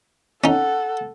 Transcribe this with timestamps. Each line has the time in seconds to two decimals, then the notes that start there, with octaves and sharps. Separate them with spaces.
0.44 C#4 D#4 A4 F#5